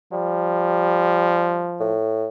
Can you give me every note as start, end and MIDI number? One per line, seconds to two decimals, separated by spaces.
0.13 1.96 53
0.13 1.67 55
1.80 2.28 45